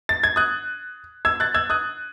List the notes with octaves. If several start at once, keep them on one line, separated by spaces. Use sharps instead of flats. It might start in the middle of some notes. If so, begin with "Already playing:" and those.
A6
G#6
D#6 F#6
E6 G#6
F#6 A6
E6 G#6
D#6 F#6